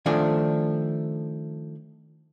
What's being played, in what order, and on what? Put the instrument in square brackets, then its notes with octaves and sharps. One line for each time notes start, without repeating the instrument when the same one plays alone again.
[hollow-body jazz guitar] D#3 F3 A3 D4 G#5